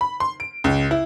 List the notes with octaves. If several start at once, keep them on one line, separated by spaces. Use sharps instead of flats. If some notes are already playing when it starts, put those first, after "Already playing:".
B5
C6
D7
C#2
E4